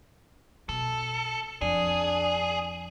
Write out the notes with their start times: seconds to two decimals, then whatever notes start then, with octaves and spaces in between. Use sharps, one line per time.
0.69 B2 A4
1.61 F2 D4 G#4